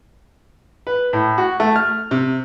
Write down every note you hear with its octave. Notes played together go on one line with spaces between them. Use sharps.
B4
A2
F#4
A3
F6
C3